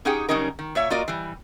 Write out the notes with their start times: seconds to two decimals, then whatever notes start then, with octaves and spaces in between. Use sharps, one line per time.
0.05 C#4 D#4 G4 G#4 F#5 G5
0.29 C#3 F#3 G3 C#4 D#4 A#4
0.59 D#3
0.75 A#2 C#5 E5
0.90 A#3 F4 F#4 A#4 D5 D#5
1.08 E3 G3